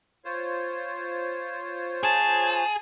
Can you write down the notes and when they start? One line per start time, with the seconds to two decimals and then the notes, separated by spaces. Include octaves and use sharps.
0.25 F4 C5 C#5
2.03 G#4 A5